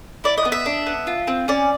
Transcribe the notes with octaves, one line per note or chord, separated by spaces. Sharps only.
E4 D5
D#5
B3
E5
D4
B3
F4
C4
C#4 D5